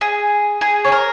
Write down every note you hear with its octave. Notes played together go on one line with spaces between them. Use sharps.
G#4
G#4
C#5
A#4